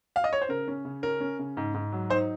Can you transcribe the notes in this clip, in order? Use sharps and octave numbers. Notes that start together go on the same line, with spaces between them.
F5
D#5
C#5
C5
C#3 A#4
C#4
C#3
C#4 A#4
C#4
C#3
G#2
G#2
F#3
D#4 C5